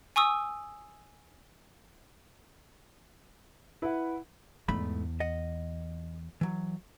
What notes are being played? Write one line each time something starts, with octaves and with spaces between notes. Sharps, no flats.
G#5 C#6 D#6 E6
E4 B4 F#5
E2 G#2 A3 B5
D#5 F#5
E3 F#3